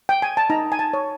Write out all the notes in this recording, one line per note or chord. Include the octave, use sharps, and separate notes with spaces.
G5
G#5
A5
D#4 A#5
G#5
A5
C#5